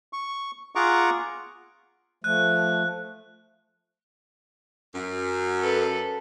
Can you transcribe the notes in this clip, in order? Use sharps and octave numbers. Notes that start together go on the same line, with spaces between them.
C#6
F4 G#4 F#5 A#5 C#6 D6
F3 A3 F#6
F#2
A4 B4